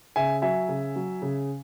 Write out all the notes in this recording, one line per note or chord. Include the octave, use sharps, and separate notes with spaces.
C#3 E5 G#5
F#3 E5 G#5
C#3
F#3
C#3